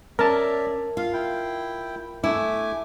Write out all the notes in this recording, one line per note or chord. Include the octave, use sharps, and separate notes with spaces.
C#4 A#4 D5 E5 A5
F4 F5
E4 G5
A3 E4 G#5 D6